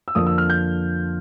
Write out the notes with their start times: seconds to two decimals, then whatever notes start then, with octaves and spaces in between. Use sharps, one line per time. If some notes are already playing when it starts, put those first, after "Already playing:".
0.08 E6
0.15 F2 D3 F3 A#3 D4 D#6
0.27 E6
0.38 F6
0.50 G6